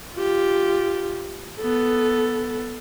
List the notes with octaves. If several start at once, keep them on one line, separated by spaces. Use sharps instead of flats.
F4 G4
B3 A4